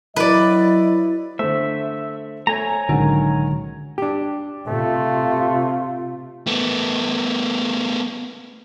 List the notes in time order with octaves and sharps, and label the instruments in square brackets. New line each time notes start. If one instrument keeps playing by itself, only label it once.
[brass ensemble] F#3 [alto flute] E4 [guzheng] B4 D5 [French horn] D#5
[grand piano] D3 A3 [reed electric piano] C5 [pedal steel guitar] E5
[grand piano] A3 [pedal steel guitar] C#5 G#5 A#5
[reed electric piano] C2 A2 G#3 [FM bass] D3 [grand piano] D#3 F#3 C#4
[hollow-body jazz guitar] D4 G4
[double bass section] C3 [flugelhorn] A3 [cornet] F4
[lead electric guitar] A3 B3